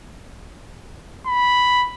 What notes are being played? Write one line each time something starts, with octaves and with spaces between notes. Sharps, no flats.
B5